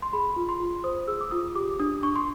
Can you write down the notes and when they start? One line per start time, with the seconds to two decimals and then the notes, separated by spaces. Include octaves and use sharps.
0.02 C6
0.13 G#4 B5
0.36 F4
0.49 C6
0.60 F4
0.84 C5 D#6
1.08 G#4 E6
1.21 D6
1.31 F4 D#6
1.55 G4 D6
1.79 D4 D#6
2.03 D4 C#6
2.16 C6